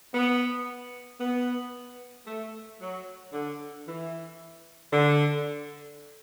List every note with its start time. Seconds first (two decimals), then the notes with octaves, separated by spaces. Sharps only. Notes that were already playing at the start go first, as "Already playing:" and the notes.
0.14 B3
1.20 B3
2.27 A3
2.81 F#3
3.33 D3
3.87 E3
4.93 D3